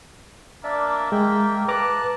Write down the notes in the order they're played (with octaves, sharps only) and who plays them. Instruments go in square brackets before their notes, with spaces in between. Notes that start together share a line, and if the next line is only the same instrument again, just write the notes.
[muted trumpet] A#3 [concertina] D4 D5 E5
[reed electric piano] G#3 [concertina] E5 G5
[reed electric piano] B4 A#5 D6 [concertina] A5 F#6